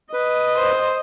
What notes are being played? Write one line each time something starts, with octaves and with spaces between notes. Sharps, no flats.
B4 D#5
C5